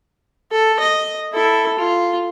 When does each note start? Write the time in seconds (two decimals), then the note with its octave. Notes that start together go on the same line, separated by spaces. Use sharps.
0.51 A4
0.80 D#5
1.33 E4 A4
1.79 F4